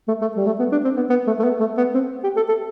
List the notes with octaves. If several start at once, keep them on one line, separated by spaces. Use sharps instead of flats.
A3
A3
G3
A3
B3
D4
C4
B3
B3
A3
A3
B3
A3
B3
C4
G4
A4
A4